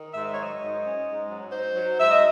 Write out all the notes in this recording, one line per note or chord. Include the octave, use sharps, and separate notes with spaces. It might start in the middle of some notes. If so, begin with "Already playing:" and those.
Already playing: D#3
G#2 E5
D#5
F#3 C#5
D#5
G#2
C#4
G#2
F#3
D#4 C5
F#3
G#2 E5
D#5